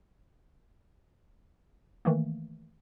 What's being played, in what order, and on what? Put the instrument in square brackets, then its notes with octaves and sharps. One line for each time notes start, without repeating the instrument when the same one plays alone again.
[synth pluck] D#3 E3 A3 A#3